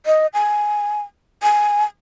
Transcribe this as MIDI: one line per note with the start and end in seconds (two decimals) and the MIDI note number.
0.06 0.27 75
0.34 1.01 80
1.43 1.84 80